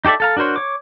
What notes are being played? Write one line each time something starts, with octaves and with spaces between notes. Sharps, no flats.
D#4 G4 A4 D5 E5
A4 F5 A#5
D4 F#4 A#4 C5 C#5
C#5 D6